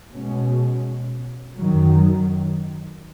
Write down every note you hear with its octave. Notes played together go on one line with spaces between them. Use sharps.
B2 G#3 C#4
F#2 D#3 F#3